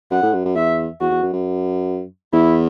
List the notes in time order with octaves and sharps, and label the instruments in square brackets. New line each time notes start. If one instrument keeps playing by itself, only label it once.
[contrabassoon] F#2 [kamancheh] F#5
[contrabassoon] A2
F#2
F#2
[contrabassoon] E2 [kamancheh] E5
[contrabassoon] E2 [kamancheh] F#4
[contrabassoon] E2
F#2
F#2
[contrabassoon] E2 [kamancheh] E4